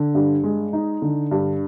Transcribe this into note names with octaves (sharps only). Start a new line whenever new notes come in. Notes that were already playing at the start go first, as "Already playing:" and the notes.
Already playing: D3
G2
G#3
D#4
D3
G2